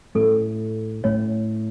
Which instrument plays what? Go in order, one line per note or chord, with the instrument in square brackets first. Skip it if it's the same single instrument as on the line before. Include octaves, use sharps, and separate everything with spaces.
[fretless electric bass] A2 A3 C#4 [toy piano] A4
[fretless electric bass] A2 A3 C#4 [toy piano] C#5